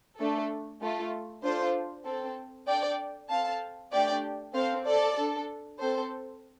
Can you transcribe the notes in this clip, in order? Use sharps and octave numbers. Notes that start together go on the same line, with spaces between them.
A3 D4 A4
A3 F4 A4
D4 F4 A4 C5
C4 A4
D4 A4 D5 G5
C4 A4 F5 A5
A3 D4 G4 D5 G5
C4 A4 C5 F5
A4 D5
D4 A4
C4 A4 C5